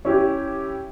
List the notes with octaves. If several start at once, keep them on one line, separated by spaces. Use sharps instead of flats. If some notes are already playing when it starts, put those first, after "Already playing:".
C#4 E4 G4